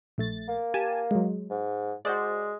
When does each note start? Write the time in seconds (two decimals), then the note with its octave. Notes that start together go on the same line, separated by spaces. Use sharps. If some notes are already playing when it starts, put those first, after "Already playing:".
0.18 A#1 A3 A6
0.48 A#3
0.74 G4 G#5 A5
1.11 F#3 G#3
1.50 G#2
2.05 G#3 F#4 C5 D5